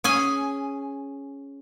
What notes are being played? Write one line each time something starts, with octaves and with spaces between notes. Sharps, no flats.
C#4 G#4 G#5